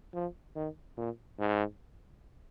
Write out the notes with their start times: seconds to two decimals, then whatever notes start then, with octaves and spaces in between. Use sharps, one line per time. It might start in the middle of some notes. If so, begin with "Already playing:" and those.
0.14 F3
0.55 D#3
0.97 A#2
1.39 G#2